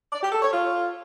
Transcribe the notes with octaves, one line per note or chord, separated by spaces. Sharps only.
D5
G4
A4
C#5
F4